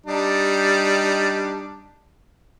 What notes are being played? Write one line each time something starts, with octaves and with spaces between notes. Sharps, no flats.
G3 D4 D#4